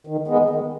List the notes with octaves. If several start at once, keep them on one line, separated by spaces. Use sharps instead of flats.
D#3
G#3 B3 D#4
D#3